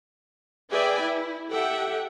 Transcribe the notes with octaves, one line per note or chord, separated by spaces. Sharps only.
G#4 B4 D5 E5 G5 G#5
E4
G4 A4 E5 F#5 G5